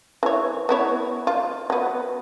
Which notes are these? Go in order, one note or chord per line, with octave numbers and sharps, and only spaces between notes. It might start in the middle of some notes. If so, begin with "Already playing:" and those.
E3 C#5
B3 E4 C#5
F4
F#3 B3